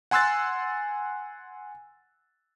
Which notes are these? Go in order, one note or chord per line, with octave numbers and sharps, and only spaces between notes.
F#5 G#5 C6 E6 F#6 A6